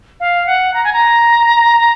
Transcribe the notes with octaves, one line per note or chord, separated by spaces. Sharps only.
F5
F#5
A#5
G#5
A#5